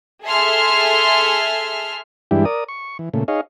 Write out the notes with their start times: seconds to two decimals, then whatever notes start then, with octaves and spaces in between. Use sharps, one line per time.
0.24 G#4 A4 E5 C6 F6
2.31 G2 E3 G#3 D4 E4 G4
2.45 A#4 D5 D#6
2.69 C#6
2.99 E3
3.14 A#2 C#3 A3
3.28 D#4 G#4 C#5 D#5 F5